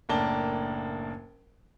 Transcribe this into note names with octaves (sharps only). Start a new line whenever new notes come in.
F#1 A2 A#3 D4 A5 G7